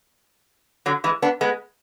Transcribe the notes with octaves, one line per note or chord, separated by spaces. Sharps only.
D3 F#3
E3 G#3
B3 D4
G#3 B3